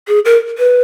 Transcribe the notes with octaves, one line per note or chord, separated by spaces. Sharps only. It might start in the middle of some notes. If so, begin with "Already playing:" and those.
G#4
A#4
B4